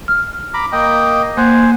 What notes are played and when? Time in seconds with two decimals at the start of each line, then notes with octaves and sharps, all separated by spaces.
0.08 F6
0.54 A#5 B5 D6
0.72 A#3 D#5 G5
1.37 A#3 C5 F#5 G#5